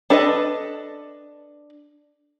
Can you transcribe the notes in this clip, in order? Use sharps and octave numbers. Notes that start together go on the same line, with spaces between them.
D4 A4 B4 D5 D#5